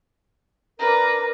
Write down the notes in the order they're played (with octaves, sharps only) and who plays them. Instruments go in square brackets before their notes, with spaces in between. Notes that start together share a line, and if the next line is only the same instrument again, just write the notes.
[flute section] D4 A#4 [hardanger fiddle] B4 A#5